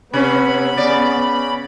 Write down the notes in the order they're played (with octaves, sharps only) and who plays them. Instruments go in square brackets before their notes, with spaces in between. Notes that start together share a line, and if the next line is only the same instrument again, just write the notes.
[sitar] C3 C#4 [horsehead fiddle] B3 [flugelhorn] B4 [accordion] B5
[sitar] C#3 D5 [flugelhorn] C#4